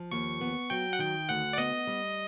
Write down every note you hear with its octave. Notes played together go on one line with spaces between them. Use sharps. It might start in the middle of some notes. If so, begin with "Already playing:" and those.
Already playing: F3
D#2 C#6
B3
F#3 G5
F#5
D#3 G5
D2 F#5
D5
B3 D#5
G3